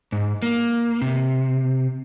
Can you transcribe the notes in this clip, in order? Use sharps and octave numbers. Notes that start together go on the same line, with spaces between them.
G#2
A#3
C3